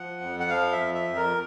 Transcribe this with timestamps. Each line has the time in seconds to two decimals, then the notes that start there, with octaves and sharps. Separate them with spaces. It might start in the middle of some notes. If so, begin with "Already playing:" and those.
Already playing: F3 F#5
0.21 F2
0.40 F#5
0.50 F3 F5
0.72 E5
0.79 F2
0.94 E5
1.09 F2
1.16 A#4